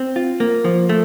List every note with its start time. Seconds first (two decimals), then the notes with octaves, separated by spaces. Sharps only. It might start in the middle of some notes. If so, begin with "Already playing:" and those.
Already playing: C4
0.16 F4
0.40 A#3
0.65 F3
0.89 A3